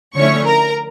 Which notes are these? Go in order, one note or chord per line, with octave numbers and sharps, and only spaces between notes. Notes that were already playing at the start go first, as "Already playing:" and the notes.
D3 F3 A3 C#4 E4 C#5 C#6
A#4 A#5